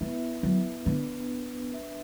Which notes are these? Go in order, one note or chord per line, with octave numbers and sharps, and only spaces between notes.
A3 B3 E4 B4 E5
F#3
D3 B3 D4 B4
D4 B4 E5